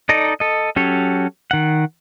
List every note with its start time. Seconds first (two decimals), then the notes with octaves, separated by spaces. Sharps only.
0.09 D#4 A4 D5 D#5 A#5
0.40 A4 D#5
0.76 F#3 C#4 G4 A4 C#5
1.51 D#3 F#5